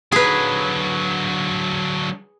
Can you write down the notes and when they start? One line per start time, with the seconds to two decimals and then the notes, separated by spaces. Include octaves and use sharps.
0.12 D3 F#3 G#4 B4